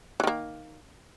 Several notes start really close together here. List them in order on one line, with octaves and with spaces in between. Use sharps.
E3 D#3 A#3